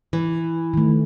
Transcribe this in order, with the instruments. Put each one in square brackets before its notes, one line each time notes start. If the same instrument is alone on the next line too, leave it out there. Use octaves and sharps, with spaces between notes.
[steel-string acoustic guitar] E3
[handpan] D#3 A3